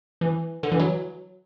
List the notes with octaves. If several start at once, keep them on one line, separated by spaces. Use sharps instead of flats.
E3
D3
E3
F#3